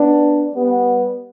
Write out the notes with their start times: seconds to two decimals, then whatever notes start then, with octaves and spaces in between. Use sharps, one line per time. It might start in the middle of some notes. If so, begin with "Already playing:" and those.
Already playing: B3 D4
0.55 G3 B3